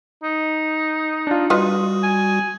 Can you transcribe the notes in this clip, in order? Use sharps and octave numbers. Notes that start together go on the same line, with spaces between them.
D#4
D4 F4
G3 F4 F#4 B4 D#5 D#6
G#5